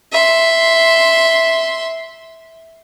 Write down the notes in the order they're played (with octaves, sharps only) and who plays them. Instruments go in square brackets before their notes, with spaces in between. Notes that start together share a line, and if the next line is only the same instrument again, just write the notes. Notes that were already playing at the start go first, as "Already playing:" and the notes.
[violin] E5 C6